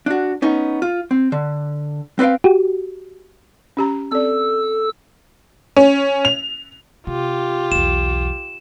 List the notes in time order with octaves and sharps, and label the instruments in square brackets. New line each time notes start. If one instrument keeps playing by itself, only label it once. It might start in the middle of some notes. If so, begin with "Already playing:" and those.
[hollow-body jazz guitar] D4 F#4
B3 C#4 D#4
F4
C4
D3
C4 B4 D5 F5 G5
[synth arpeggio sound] F#4 G4
[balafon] C#4 G4 A#5
[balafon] C4 D5 [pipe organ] A4 E6
[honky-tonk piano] C#4
F7
[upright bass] C3 [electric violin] F4 G4
[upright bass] B1 E2 [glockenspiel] E7